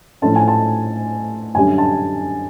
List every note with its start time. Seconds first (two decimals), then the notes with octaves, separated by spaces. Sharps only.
0.22 A2 F3 A3 C#4 A5
0.36 G#5
0.48 A5
1.55 F#2 D3 G3 G#5
1.78 A5